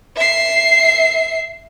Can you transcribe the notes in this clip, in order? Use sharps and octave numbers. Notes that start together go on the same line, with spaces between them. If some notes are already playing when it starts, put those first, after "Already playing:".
E5 C7